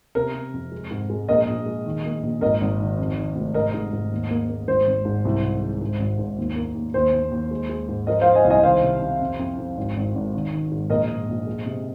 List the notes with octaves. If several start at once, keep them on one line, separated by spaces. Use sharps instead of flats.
C3 A#4
C3
F2
G#3
G#2
G#3
A#1 A#4 D#5
A#1
G#3
D#3
A#3
A#1
G#1 A#4 D#5
G#1
D#3
F2
D#3
F1
G#2 A#4 D#5
G#2
G#2
D#2
A#3
A#3
G#1 C5
G#1
G#2
C2
C2
G#3
G#2
G#1
G#2
D#2
A#3
D#2
D#2 C5
D#2
D#2
G#3
G#3
G#2
F3 A#4 D#5
F3 C5 F5
D#5 G#5
C2
D#5 G#5
D#3 C5 F5
C3
C3
F2
F2
F2
G#1
G#1
G#1
D#3
D#3
G#2
A#1 A#4 D#5
G#2
A#1
G#3
C3